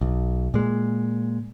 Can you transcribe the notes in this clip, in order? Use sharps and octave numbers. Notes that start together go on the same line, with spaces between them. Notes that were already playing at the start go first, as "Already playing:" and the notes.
B1
A#2 G#3